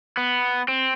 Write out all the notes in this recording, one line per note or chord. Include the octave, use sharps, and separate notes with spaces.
B3
C4